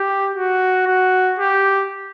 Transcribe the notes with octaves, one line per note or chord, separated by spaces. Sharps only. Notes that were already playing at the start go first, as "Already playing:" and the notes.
Already playing: G4
F#4
F#4
G4